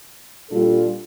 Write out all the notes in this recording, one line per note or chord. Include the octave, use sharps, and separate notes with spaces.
A#2 G3 D4 F4 A4